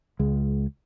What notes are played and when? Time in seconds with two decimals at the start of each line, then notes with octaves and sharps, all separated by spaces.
0.19 C#2 G#3